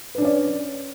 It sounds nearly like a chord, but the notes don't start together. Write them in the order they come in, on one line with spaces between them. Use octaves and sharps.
B4 D4 C#4 D5